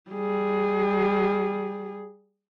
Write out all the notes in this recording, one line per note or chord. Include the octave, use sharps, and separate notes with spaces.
G3 G#4